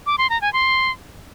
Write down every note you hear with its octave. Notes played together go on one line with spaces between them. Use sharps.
D6
C6
A#5
G#5
C6